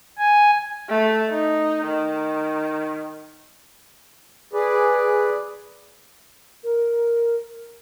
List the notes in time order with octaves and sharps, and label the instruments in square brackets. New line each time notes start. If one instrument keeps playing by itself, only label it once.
[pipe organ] G#5
[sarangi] A3
D#4
D#3
[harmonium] G#4 B4 D5
[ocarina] A#4